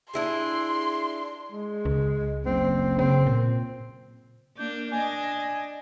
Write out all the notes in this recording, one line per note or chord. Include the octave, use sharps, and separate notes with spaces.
D4 E4 G#4 C6
G#3
C#2
F#1 C4
C#3 C4
A#2
A#3 D4 G6
D4 D#5 G#5